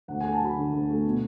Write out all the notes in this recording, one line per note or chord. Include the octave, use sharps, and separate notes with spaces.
D2 F#5
A3 G#5
A5
F#3 B5
D3
D2
A3
B2